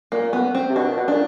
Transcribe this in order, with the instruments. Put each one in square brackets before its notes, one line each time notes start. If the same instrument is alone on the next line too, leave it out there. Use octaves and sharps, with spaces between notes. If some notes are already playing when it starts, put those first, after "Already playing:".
[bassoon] A#2 [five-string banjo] A#3
[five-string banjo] B3
C4
[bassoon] C3
[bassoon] B2 [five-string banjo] D4
[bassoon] A#2
B2
[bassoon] A#2 [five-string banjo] D4